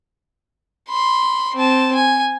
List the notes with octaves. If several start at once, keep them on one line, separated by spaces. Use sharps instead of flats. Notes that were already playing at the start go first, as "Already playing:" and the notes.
B5 C6
C4 A5
G#5